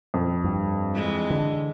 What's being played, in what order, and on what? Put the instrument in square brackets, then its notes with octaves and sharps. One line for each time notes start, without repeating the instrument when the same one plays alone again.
[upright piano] F2
[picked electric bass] G2
[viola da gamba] E3 G#3
[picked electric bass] D3